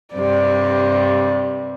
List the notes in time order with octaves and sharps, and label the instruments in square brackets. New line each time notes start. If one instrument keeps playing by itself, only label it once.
[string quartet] G2 C3 G3 [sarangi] D5